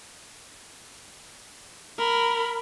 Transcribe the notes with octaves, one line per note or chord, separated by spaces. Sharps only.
A#4 B5